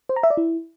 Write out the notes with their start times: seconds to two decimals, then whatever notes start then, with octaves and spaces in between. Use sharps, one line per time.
0.09 C5
0.16 A#5
0.23 E5
0.30 D5
0.37 E4